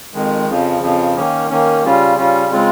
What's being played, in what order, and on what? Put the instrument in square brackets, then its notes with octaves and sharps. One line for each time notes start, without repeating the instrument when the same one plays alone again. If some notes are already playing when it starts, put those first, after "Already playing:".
[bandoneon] F2 D#3 G#3
F2 C#3 F3
F2 C#3 F3
D#3 A#3 C#4
D#3 A#3 C#4
C#3 G3 C#4 F4
C#3 G3 C#4 F4
C#3 G#3 C4 F4